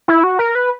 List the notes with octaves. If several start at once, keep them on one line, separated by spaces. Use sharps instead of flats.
E4
F#4
A#4
B4